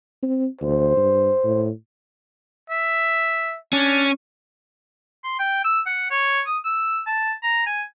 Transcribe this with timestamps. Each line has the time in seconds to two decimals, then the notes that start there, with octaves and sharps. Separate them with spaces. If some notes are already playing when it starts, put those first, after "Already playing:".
0.22 C4
0.61 D2 C5
0.97 G2
1.44 A2
2.70 E5
3.73 C#4 D4
5.24 C6
5.39 G5
5.64 E6
5.86 F#5
6.10 C#5
6.46 D#6
6.64 E6
7.06 A5
7.43 A#5
7.66 G#5